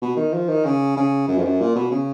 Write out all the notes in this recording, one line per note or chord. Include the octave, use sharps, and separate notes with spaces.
B2
D#3
F3
D#3
C#3
C#3
F#2
F2
F#2
A#2
B2
C#3